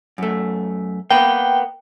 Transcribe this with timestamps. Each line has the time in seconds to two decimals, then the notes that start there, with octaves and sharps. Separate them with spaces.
0.18 F#2 A3
1.10 A#3 B3 B4 G5